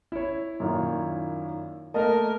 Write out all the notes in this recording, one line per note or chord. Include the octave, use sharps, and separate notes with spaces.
E4 C#5
F#2 A#2 D#3
A3 A#3 A#4 D#5 A5